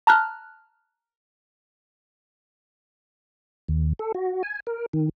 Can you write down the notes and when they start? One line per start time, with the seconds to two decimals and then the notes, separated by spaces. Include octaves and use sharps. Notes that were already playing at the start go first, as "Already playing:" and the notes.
0.07 A5 A#5 F6 F#6
3.69 D#2
3.99 A4
4.15 F#4
4.43 G#5
4.67 A#4
4.93 D#3